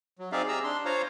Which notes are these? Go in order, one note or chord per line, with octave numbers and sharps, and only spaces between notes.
F#3
C4 D#4 G#4 D5 E5 F5
G4 G#4 A#5 E6
D4 C6
F4 C5 C#5 F5 A#5